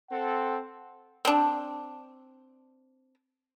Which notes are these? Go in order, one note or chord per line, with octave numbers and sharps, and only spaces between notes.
C4 A4 F#5
C4 D4